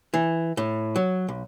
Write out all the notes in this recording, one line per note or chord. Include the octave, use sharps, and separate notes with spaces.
E3
A2
F#3
B1